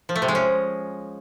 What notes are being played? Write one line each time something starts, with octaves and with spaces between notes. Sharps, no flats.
F3
A3
C3
G#3
C#4